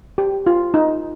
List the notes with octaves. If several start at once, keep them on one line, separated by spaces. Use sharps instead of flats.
G4
F4
D#4